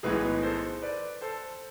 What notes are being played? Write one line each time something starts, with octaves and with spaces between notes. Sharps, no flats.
B1 A2 E3 G#3 B3 G#4 B4
A4 C5
B4 D5
A4 C5